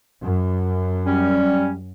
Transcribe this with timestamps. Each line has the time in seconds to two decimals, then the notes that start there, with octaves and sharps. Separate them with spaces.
0.22 F#2
1.06 G3 C#4